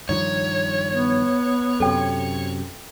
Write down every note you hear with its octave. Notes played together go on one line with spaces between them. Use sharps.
G2 D#3 F3 C#5
B3
F#2 C3 A4 G5